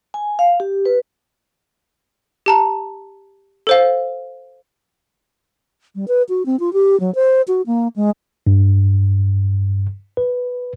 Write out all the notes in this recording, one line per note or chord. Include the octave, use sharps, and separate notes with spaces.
G#5
F5
G4
B4
G4 A5 A#5
A4 C5 F5
G3
B4
F#4
C4
F4
G4
F#3
C5
F#4
A#3
G#3
G2
B4